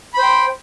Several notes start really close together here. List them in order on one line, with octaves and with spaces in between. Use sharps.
B5 C5 G5